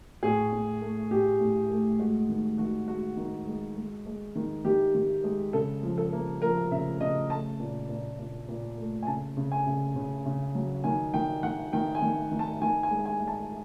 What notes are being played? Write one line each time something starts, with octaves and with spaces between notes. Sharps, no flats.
A2 G#4
A2
A3
A2 G4
A2
A3
G#3 F#4
D#3
D#3 F#4
G#3 F#4
D#3
G#3
G#3
G#3
D#3
D#3 G4
D#3
G#3
C#3 A4
F3
A4
A#3
F3 A#4
C#3 E5
C#3 D#5
A3 A5
A#2
A#2
A#2
A#2
A3
G#5
C#3 A5
C#3
G#5
C#3
C#3
C#3
F#3
D#3 G#5
D#3 G5
D#3 F#5
D#3 G5
G#5
D#3
D#3
A5
D#3 G#5
G#5
G#3
G#5
G#3
A5